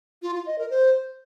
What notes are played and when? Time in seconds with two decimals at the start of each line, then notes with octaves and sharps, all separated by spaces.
0.22 F4
0.34 F4
0.46 D#5
0.58 A#4
0.70 C5